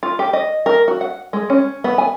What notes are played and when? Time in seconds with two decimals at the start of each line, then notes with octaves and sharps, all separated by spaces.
0.03 F4
0.19 G4
0.33 D#5
0.66 A#4
0.88 F#4
1.01 F#5
1.33 G#3
1.50 C#4
1.84 B3
1.98 G#5